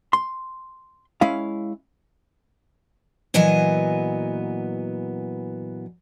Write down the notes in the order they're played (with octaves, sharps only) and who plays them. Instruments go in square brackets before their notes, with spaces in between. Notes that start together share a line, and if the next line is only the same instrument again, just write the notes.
[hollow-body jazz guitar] C6
G#3 C#4 E4 F5
[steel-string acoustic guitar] A#2 E3 F#3 B3 D#5 G#5